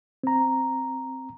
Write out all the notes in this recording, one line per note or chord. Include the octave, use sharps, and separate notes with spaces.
C4 A#5